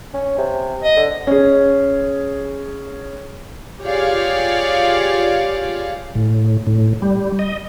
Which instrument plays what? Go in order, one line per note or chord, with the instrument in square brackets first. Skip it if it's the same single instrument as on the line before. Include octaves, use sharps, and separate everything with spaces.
[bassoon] C#4
C3
[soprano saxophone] D#5
[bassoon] D3
[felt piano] C#4 G#4
[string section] F4 G4 G#4 C#5 D5 F5
[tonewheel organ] A2
A2
G3
D#5